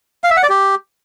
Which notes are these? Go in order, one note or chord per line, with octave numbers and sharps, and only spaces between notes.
F5
E5
F#5
D5
G4